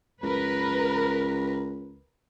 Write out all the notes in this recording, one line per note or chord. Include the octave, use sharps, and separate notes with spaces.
C#2 A#4 B4